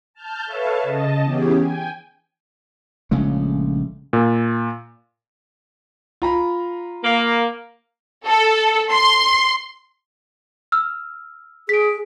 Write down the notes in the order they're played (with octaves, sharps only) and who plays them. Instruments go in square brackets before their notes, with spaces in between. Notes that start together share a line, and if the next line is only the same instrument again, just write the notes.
[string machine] A5 F6 G6
A4 B4 C#5 E5 F5 A5
C#3 D#5 A5
E3 B3 C#4 G4 G#4
G5 G#5
[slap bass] A#1 C#3 G#3 A3
[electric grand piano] A#2
[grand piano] F4 A#5 B5
[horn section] A#3
[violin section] A4
C6
[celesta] E6 F6
[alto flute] G#4 [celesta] B6 D7